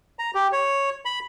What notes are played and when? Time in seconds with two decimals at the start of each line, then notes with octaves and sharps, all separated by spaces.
0.19 A#5
0.34 G4
0.52 C#5
1.05 B5